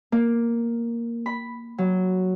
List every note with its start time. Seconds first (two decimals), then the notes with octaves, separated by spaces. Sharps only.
0.12 A#3
1.26 B5
1.78 F#3